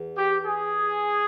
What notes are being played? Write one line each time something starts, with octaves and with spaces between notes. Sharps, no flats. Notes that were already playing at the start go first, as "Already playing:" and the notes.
Already playing: E2
G4
G#4